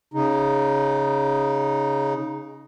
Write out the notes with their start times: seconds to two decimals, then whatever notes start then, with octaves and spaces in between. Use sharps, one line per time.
0.14 C#3 D#4